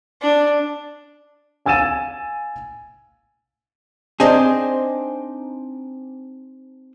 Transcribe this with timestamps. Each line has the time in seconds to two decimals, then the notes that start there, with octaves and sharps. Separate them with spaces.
0.22 D4
1.66 F5 G#5 E6 A6 D#7 E7
4.20 C4 D4 D#4 G#4